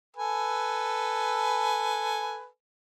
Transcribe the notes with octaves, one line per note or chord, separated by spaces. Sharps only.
A4 B4 G#5